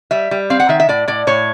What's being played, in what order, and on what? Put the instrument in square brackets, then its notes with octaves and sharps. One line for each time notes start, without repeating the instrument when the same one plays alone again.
[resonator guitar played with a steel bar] G3 E5
G3
C4 F5
F#5
D#3 E5
E5
A2 D5
A2 D5
A2 C#5